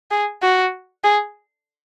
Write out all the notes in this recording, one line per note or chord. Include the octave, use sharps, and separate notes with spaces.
G#4
F#4
G#4